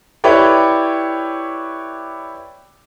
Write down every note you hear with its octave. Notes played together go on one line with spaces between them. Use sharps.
E4 G4 B4 C#5 D5 G5